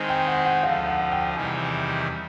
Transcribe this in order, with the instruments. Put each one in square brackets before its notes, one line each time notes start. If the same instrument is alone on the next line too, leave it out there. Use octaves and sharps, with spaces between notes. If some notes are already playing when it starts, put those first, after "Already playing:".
Already playing: [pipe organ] D#3 G#3 C4
[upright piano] G5
F#5
F#5
[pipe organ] D2 D3 F3 [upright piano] F5
[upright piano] F#5
F#5
G5
[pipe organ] E2 C3 D#3 G3 C4 [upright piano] G#5